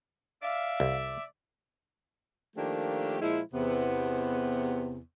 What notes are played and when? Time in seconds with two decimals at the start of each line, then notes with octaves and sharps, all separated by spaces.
0.43 D5 E5 F5
0.80 C2
2.57 D#3 F3 A3 A#3 D4 G4
3.21 A#2 F3 G#3 E4
3.54 E2 C3 B3